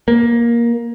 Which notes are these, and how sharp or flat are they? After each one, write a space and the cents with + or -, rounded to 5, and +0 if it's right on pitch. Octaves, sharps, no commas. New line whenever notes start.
A#3 +15